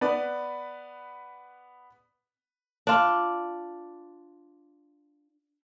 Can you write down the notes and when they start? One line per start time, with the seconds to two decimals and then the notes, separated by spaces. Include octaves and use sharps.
0.01 B3 B4 D5
2.87 D4 F4